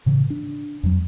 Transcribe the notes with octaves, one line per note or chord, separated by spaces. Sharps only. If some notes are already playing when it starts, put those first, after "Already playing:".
A2 C#3 E3
D4
F2 F#3